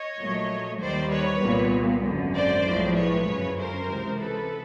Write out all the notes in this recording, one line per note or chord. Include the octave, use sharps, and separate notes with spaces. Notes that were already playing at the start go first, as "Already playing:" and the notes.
Already playing: C#5 D#5
A#1 A#2 F#3 A3
D#2 D#3 G3 C5 D5
B4 C#5
C2 A#2 G3 B3
G#1 F#2 D3
C5 D5
B1 A2 F3 G#3
B4 C#5
G1 F#2 C#3
A#4 C5
C#2 C3 E3 G#3
A4 B4